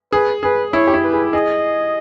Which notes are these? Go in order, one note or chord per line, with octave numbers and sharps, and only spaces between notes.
G#4 B4
G#4 B4
E4 C#5
G4
E4
B4
G#4
G#4 D#5